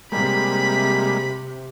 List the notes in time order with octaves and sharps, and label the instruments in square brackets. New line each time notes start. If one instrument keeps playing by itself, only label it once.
[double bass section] C3 [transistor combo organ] G3 G#3 A#3 [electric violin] B5 B6